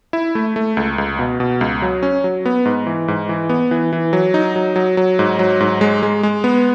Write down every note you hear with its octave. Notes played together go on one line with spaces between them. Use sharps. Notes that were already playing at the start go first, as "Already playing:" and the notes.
E4
A3
A3
C#2
C#2
B2
B2
C#2
F#3
C#4
F#3
B3
G#2
E3
G#2
E3
B3
E3
E3
F#3
D#4
F#3
F#3
F#3
G#2
F#3
G#2
G#3
G#3
G#3
B3